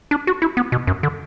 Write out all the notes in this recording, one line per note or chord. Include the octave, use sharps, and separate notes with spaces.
D4
F#4
E4
B3
B2
F#2
D3